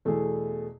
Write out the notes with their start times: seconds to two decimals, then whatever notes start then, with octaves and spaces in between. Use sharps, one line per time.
0.05 E2 B2 A3 E4 G#4